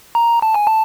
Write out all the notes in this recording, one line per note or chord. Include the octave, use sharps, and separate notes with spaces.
A#5
A5
G#5
A5